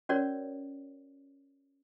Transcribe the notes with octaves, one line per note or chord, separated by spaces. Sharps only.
C#4 F#4 A#4 C#5 D5